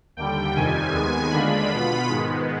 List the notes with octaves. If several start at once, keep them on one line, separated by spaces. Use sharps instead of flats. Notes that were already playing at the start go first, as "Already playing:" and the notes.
D#2 D3 G3 G5
F2 C3 D#3 G3 G#5
D#2 D#3 G#3 B3
D#2 D3 G#3 D4 F4 B5
B2 B3 F4
G#2 D#3 G#3 B3